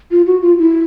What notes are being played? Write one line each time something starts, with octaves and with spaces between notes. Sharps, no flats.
F4
F#4
F4
E4